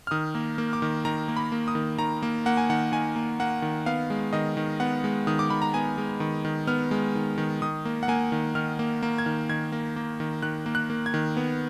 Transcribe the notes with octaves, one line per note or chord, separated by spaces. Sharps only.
F6
D#3 D#6
A#3
A#3
D6
D#3
D#3 A#5
A#3
B5
A#3
D#6
D#3
D#3 A#5
A#3
A#3 F#5
G#5
D#3 F#5
D#3 G#5
A#3
A#3 F#5
D#3
B3 F5
G#3
D#3 D#5
D#3
B3 F#5
G#3
D#3 D#6
D6
D#3 B5
A#5
B3 G#5
G#3
D#3
D#3
B3 F6
G#3
D#3
D#3
D#3 D#6
A#3
F#5
A#3 G#5
D#3
D#3 F6
A#3
A#3
G#6
D#3
D#3 G#6
A#3
A#3
D#3
D#3 F#6
A#3
F#6
A#3
G#6
D#3
B3